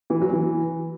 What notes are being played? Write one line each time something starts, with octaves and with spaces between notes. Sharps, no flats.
E3
F#3
E3